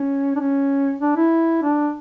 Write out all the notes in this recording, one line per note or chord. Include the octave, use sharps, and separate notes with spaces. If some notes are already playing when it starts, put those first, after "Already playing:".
Already playing: C#4
D4
C#4
D4
E4
D4